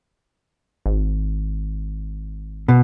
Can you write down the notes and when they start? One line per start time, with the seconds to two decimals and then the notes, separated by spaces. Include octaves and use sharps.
0.86 G#1
2.68 B2